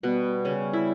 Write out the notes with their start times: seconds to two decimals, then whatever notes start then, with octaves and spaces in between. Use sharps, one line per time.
0.03 B2 G3 B3
0.45 C#3 C#4
0.73 E4